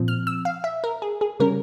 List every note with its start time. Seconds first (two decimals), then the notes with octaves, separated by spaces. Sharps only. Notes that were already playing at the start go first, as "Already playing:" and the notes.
Already playing: A#2 F3 C4
0.08 F6
0.27 E6
0.45 F5
0.64 E5
0.84 A#4
1.02 G#4
1.21 G#4
1.40 C#3 G3 C#4 A#4